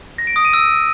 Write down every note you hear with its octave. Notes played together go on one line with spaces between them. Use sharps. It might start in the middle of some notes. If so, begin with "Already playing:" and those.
A#6
D7
D#6
D#7
E6